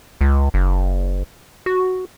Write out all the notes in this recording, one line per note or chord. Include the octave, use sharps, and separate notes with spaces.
C#2
F#1
F#4